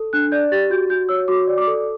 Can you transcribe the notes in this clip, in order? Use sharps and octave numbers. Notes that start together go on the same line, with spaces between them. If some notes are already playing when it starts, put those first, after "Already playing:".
Already playing: A4
D4 F#6
D5 G6
G4 A6
F#4 G6
F#4 G6
C#5 E6
F#4 D6
D5
D6
A4